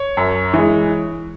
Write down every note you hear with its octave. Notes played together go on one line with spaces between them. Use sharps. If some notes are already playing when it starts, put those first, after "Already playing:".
Already playing: C#5
F#2
E3 G#3